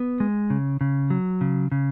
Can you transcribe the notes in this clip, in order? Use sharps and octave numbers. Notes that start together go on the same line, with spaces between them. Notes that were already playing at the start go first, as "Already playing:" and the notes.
Already playing: B3
G#3
C#3
C#3
F#3
C#3
C#3